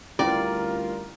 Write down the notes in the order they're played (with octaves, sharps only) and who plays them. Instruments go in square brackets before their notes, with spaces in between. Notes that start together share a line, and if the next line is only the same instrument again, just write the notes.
[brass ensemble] D2 G3 A#4 [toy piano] C#4 E4 [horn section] F4 [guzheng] D5